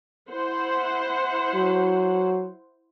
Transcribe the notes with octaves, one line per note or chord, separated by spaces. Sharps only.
E4 C5 F#5
F#3